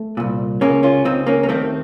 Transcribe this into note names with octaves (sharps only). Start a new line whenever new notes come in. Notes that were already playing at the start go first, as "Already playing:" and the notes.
Already playing: A3
C2 A#2
C#2 C#3 A#3 C#4
C#4 F4
C#2 C#3 C4 D#4
A#3 C#4
A#3
D#2 D#3 A3 C4